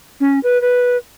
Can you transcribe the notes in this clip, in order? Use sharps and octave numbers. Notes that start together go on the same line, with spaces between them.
C#4
B4
B4